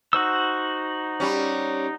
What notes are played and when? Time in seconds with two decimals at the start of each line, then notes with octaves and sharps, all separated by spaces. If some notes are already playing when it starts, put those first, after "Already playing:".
0.13 D#4 F#4 C5 E6
1.20 G3 C#4